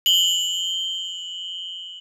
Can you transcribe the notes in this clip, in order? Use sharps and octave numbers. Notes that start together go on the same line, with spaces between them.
F#7 G7